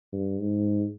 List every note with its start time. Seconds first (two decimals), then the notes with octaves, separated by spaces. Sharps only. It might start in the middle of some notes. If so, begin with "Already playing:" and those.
0.13 G2
0.40 G#2